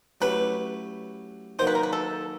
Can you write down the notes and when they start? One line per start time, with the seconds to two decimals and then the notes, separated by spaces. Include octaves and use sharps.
0.21 F#3 A3 C#4 E4 G4 B4
1.59 D#3 F#3 A#3 D#4 C5
1.67 B4
1.75 A#4
1.83 B4
1.93 A4